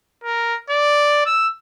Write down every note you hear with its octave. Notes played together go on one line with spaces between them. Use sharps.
A#4
D5
E6